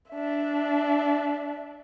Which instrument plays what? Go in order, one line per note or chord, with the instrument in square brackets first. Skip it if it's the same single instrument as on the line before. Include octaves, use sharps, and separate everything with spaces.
[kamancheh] D4 E5